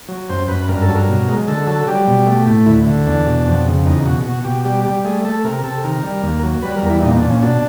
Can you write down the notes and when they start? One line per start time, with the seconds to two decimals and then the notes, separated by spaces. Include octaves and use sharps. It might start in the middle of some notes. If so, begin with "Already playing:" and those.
0.09 F#3
0.29 F#2 C5
0.48 F#2 B4
0.69 G2 A#4
0.81 A4
0.89 F#3
0.95 A#4
1.09 B2
1.29 G#3
1.48 D3 A4
1.67 F#3 A4
1.87 G3 G4
2.07 B2
2.26 A3
2.47 A2
2.66 D2 E4
2.86 D3
3.07 E2 D4
3.26 B2
3.47 F2
3.66 C#3
3.85 E2 D#4
4.05 B2 F#4
4.25 B2 F#4
4.45 B2 G4
4.65 G3 G4
4.85 G3 G4
5.05 A3 G#4
5.25 A3 A4
5.44 C3 A#4
5.63 C3 A4
5.84 D#3 A#4
6.03 G3
6.23 D#2
6.43 F#3
6.62 G3 B4
6.76 A#4
6.82 E2
6.90 E4
7.03 A#2 D#4
7.16 D4
7.23 A#2
7.30 C#4
7.42 B2 D4